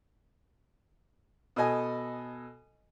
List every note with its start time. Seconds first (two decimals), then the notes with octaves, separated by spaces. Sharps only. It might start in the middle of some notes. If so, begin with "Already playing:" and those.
1.56 B2 A4 D#5 G#5